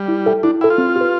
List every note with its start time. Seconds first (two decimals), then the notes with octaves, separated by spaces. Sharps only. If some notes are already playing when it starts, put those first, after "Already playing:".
Already playing: G3
0.08 E4
0.26 A4 E5 G5
0.43 D4 E4
0.61 E4 A4 E5 G5
0.70 F4
0.78 C4
0.96 G4 B4